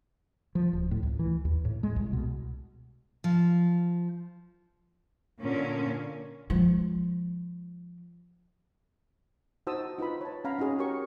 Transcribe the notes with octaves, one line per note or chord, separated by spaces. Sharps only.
F3
D1
A2
C#2
E3
D#2
A2
G#3
C2
B2
F3
A#2 D3 A#3 C#4
F3 G#3
D#4 F#4 C5 A5 D#6 E6
D#4 F4 B4 B5
C#5 A5
C#4 F5 F#5 A#5 B5
C#4 D#4 F#4 G#4 C#5
F#4 G4 A#4 C#5 C#6